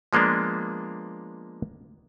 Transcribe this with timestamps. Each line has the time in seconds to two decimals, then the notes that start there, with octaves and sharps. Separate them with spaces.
0.13 F3 G#3 A#3 B3 D4